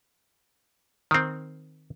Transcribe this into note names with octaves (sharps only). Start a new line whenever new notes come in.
D#3 C4